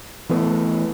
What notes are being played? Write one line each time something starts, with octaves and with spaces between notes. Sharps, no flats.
E3 A3 B3